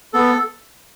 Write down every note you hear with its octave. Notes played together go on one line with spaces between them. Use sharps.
B3 A4